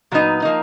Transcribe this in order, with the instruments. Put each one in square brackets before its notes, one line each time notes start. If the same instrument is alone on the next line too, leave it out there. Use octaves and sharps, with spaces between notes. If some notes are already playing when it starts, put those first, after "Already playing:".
[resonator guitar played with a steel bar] A#2 F#3 B3 D#4
F3 A#3 D#4